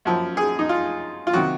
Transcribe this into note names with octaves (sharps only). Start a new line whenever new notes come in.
F#2 F3
G#4
D#4
F4
F4
C3 D#3 F#3 F#4